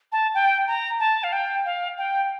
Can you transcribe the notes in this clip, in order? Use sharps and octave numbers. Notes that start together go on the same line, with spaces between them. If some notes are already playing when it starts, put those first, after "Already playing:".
A5
G5
A#5
A5
F5
G5
F5
G5